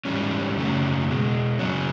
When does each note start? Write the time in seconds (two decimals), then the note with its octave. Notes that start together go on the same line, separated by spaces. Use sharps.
0.05 G#2 E3 G3 C#4
0.57 F#2 C#3 F#3 A3
1.08 B2 G#3
1.59 F#2 C#3 F#3 C#4